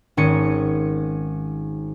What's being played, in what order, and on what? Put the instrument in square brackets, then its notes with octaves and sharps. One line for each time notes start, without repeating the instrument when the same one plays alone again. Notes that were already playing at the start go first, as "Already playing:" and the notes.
[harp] G#1 C#4 G#4 C#7 D#7